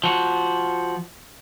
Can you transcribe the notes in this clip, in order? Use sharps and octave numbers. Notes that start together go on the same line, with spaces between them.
F3 F#4